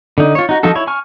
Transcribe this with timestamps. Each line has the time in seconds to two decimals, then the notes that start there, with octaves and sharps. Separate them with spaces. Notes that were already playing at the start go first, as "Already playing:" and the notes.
0.18 D3 D#4
0.35 F4 C#5
0.49 D#4 F#4
0.63 F3 D#4 F4 F#4 A4
0.75 E4 C#5
0.87 G#5 C#6 F6